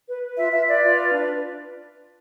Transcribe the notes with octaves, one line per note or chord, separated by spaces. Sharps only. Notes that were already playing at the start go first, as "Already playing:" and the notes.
B4
B4
F4 E5
F4 E5
B4 D5
F4
B4
D4